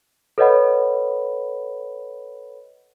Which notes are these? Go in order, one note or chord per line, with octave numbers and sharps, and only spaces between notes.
A4 B4 C#5 D#5 F#5 B5